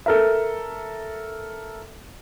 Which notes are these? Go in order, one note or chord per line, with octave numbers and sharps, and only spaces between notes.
A4 A#4 E5